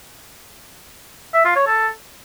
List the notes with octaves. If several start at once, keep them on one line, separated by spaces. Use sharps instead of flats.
E5
F4
C#5
A4